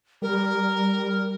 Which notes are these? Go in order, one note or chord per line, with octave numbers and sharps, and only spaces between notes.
G3 A#4